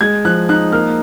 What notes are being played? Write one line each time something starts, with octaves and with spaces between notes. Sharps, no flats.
G#3 G#6
F3 F#6
D#4 F#6
A#3 F6